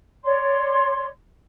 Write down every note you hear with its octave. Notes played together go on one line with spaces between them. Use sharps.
C#5 D5 C6